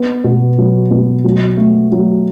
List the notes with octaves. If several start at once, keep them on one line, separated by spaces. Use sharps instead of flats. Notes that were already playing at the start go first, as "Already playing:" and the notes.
Already playing: B3
B2
F#3
B2
F#3
A3
F#3